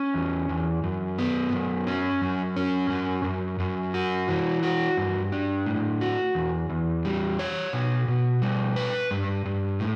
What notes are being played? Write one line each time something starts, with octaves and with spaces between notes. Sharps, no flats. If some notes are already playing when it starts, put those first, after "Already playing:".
Already playing: C#4
E2
E2
F#2
B3
F#2
C#4
F#2
C#4
F#2
F#2
F#2
F#4
E3
F#4
G2
D4
A2
F#4
E2
E2
G3
C#5
B2
B2
G3
B4
G2
G2
A2